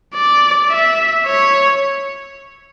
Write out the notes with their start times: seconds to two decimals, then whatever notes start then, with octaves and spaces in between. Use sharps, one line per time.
0.14 D5
0.71 E5
1.26 C#5